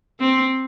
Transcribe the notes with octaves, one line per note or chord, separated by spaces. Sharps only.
C4